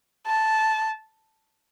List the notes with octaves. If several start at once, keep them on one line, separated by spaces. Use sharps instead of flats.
A5